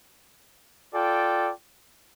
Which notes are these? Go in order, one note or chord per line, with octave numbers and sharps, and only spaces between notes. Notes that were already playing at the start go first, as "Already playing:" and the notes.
F4 A4 D5 G5